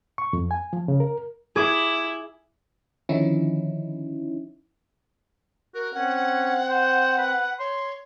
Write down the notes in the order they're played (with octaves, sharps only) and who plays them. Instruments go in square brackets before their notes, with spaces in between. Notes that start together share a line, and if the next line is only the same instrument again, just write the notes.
[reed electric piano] C#6
F2
G#5
F3
C#3
A#4
[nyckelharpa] E4 [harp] G#4 D6
[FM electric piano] D3 D#3 F3 C#4 D#4 E4
[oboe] F#4 [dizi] A#4
[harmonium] C4 [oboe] C#4 [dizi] F#5
[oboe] C5
B4
[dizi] C#5 [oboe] C6